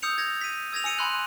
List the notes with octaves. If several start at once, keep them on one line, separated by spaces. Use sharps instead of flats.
D#6 E6 G6 C#7 F7
G#6 A#6 F7
B6 D#7
E6 G#6 A#6 F7
G#5 E6 C#7 D#7 F7
G#5 B5 C6 E6 F#6 F#7